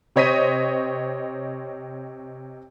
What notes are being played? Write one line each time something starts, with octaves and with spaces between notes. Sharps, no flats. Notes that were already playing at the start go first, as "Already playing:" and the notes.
C3 C4 C#5 D#5 B6 D#7